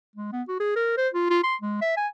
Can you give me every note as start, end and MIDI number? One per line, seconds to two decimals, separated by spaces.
0.16 0.30 56
0.32 0.42 59
0.48 0.59 66
0.60 0.75 68
0.76 0.93 70
0.97 1.08 72
1.14 1.25 65
1.30 1.39 65
1.44 1.55 84
1.62 1.80 56
1.81 1.96 76
1.97 2.07 80